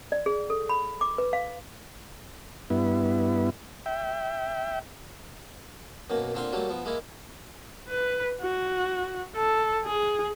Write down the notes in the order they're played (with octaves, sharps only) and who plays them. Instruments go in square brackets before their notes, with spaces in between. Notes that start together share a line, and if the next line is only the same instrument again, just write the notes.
[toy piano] D5
G#4
A4
B5
D6
B4
F5
[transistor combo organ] G2 B3 E4
E5 G5
[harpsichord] F#2 B2 A#3
A#2 D3 C4 F5 C6
F#3 G3 A3 A#3
F3 B3
G#3 A#3 E4
[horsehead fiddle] B4
F#4
A4
G#4